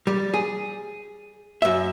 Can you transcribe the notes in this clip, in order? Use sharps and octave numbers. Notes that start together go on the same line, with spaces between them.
G3
G#4
F#2 E5